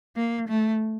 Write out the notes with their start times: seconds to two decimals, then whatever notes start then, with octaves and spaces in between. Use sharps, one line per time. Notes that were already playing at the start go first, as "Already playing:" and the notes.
0.16 A#3
0.48 A3